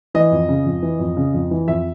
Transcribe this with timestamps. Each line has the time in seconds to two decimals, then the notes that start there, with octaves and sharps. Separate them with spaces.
0.14 E3 D#5
0.31 F2
0.49 C#3
0.65 F2
0.82 E3
0.99 F2
1.17 C#3
1.34 F2
1.51 E3
1.67 F2 E5